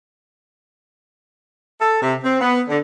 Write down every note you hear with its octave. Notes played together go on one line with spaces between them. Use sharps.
A4
C3
C4
B3
D3